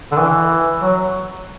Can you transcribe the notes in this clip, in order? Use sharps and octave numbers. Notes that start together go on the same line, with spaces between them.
D3
E3
F#3